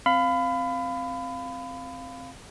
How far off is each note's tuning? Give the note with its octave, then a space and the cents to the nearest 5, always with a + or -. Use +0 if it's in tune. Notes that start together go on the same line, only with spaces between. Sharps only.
C4 +0 F5 +0 B5 +25